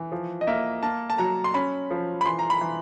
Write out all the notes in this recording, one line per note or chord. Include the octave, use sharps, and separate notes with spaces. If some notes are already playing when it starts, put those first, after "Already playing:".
Already playing: E3
F3
D#5
A#3 E5
A#3 A5
A5
F#3 A#5
C6
C#4 B5
F3
B5
E3 C6
A#5
B5
E3